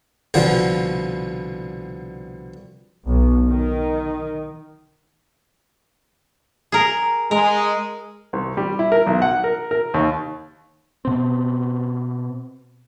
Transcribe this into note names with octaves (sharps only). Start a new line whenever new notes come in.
C2 B2 D3 F3
B1
D#3
G#4 A#4
G#3 A#4
C2
G3
E4
A#4
B1
F#5
A#4
A#4
D#2
B2 C4